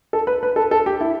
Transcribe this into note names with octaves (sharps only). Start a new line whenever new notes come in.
A4
B4
B4
A4
A4
G4
E4